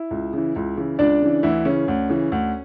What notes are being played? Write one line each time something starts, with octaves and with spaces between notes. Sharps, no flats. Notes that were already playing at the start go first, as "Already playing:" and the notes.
Already playing: E4
C#2
C#3 E3
C#2
C#3 E3
C#2 D4 D5
C#3 E3
D2 E3 E4
C#3 E3 C#4
D2
C#3 E3
D2